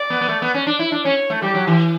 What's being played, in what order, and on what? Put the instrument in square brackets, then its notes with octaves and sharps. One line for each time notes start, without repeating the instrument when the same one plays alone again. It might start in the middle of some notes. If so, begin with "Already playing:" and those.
Already playing: [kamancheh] D5
[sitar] B3
B3
A3
B3
C#4
D4
E4
D4
[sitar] C#4 [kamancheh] C#5
[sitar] A3
[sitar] G3 [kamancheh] G4
[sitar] F#3
E3